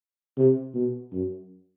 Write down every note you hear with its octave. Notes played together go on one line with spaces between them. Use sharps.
C3
B2
F#2